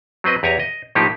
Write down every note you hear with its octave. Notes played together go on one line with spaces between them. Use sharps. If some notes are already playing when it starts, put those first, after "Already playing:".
F#3 C4 B4 D#5
E2 G4 C#5 G#5 A#5
D#5
A2 F3 A#3 D#4 G4